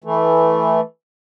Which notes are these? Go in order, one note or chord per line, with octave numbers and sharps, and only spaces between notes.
E3 A3